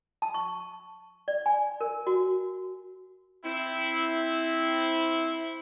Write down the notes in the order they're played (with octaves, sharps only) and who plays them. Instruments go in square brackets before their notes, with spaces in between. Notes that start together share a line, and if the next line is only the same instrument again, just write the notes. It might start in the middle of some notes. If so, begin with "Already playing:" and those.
[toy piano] A5
C#6
D5
G#5
A#4
F#4
[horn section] C4 E4